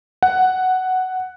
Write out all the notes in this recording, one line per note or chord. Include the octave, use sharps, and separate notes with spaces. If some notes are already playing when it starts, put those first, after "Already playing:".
F#5